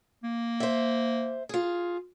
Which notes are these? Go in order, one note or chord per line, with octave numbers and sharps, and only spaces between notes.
A#3
C5 E5
F4 G#4